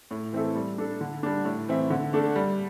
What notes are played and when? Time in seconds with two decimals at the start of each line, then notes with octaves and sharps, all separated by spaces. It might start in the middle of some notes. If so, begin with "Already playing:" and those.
0.11 A2
0.33 E3 C4 E4 A4
0.55 G3
0.78 D4 A4
1.01 D3
1.23 G3 D4
1.45 A2
1.68 E3 C4 E4
1.90 D3
2.13 A3 D4 A4
2.36 G3